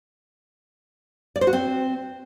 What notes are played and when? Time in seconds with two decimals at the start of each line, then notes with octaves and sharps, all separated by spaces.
1.36 D5
1.41 C5
1.47 F#4
1.53 C4